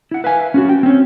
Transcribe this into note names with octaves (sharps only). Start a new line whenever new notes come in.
E4 F#5
B4 E5 F5 G#5
C#4 F4 F#4
G5
C4 C#4